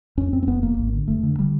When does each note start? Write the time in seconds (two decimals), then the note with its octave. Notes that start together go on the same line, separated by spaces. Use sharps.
0.17 F2 C#4
0.32 F2 C4
0.43 C4
0.47 E1 B3
0.62 E1 A#3
0.78 G#1
0.93 D3
1.08 F1 A3
1.23 D3
1.39 D3 G3